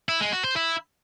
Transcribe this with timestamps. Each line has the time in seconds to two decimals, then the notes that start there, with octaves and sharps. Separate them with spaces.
0.09 E4
0.21 G#3
0.32 F#4
0.44 C5
0.56 E4